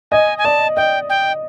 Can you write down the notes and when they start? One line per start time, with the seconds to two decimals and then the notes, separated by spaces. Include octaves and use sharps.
0.11 D#5 G#5
0.38 G#5
0.45 D5 A5
0.77 D#5 G5
1.10 G5